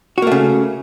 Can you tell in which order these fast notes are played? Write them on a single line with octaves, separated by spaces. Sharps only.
F#4 A#3 A3 C#3